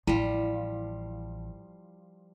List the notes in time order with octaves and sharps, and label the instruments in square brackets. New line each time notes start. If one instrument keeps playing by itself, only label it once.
[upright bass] A1 [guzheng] F3 G3 [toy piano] E4